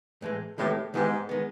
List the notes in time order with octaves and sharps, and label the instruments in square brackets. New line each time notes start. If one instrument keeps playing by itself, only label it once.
[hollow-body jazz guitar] A2 E3 G#3
[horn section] A2 [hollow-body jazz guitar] D#3 G#3 B3 E4 G4
[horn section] G#2 [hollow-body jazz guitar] D#3 G#3 B3 E4 G4
[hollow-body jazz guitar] D#3 G#3 B3